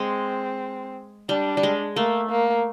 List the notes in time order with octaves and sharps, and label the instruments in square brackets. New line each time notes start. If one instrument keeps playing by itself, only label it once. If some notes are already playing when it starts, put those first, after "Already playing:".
Already playing: [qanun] G#3 [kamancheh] C4
[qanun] G3 [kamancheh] D4
[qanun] G3
G#3
[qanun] A3 [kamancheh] A#3
[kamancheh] A#3